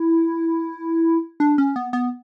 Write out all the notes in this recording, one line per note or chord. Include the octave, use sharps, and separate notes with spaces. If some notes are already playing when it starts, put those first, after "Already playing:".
Already playing: E4
D4
C#4
B3
B3